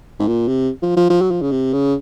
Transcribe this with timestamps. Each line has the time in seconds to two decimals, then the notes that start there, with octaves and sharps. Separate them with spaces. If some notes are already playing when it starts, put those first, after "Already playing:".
0.20 G#2
0.27 A#2
0.48 C3
0.82 F3
0.97 F3
1.10 F3
1.21 F#3
1.31 F3
1.42 C#3
1.52 C3
1.73 C#3